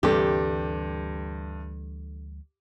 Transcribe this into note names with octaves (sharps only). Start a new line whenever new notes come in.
D2 G2 C3 E3 G3 D4 G4 A4